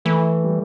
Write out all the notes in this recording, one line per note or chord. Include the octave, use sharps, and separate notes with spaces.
E3 A3
G3